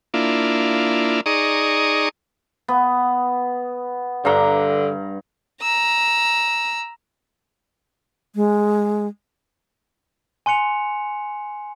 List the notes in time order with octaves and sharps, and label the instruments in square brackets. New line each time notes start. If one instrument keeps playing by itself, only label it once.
[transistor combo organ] A#3 D4 E4 F4
D#4 G#4 D5 A#5 C#6 D#6
[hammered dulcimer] B3
[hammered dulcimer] G2 A#5 [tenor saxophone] D3
[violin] A#5 E6
[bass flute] G#3
[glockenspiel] G#5 C6 F#6 C#7 F7